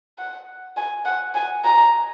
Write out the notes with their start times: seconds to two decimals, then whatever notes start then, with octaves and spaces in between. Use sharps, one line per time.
0.18 F#5
0.77 G#5
1.06 F#5
1.35 G#5
1.64 A#5